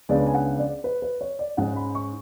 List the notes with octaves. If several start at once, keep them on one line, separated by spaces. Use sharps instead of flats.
C#2 C#3 G#3 B3 D4 D5
G#5
F#5
D5
B4
B4
C#5
D5
G#2 G#3 C#4 F#5
B5
C#6